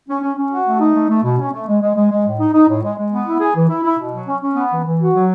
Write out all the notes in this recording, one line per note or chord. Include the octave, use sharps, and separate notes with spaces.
C#4
C#4
C#4
F#4
A3
D#4
A3
A3
B2
C#4
A3
G#3
G#3
G#3
G#3
A2
D#4
D#4
A2
G#3
G#3
B3
E4
G#4
E3
E4
E4
B2
F#3
C#4
C#4
B3
E3
E3
F#4
F#3